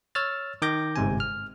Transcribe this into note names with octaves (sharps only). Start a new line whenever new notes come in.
C#5 E6 F6 A6
D#3 D6 G6 A#6
G1 G#2 C3 G#5
F6